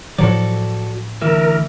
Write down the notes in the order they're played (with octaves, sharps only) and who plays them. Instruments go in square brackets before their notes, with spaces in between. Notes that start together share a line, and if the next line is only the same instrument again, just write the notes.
[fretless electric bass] A2 F3 F#3 [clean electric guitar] F#4 A4 D5
[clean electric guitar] D2 E3 E5 [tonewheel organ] A#4